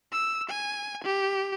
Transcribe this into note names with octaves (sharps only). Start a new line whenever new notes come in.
E6
G#5
G4